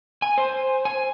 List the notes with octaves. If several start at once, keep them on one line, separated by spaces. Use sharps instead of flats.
G#5
C5
G#5